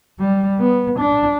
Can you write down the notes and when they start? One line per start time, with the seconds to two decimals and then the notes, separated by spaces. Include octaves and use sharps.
0.20 G3
0.60 B3
1.00 D4